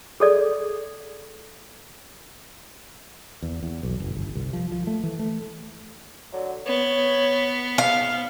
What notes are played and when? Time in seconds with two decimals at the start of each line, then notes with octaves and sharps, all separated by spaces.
0.20 G#4 A4 D5
3.42 E2
3.63 E2
3.83 B1
4.00 F#1
4.15 G1
4.35 C2
4.53 F3
4.72 F3
4.87 A3
5.03 E3
5.19 A3
6.31 D3 F#3
6.67 B3 C#5
7.78 G#2 F5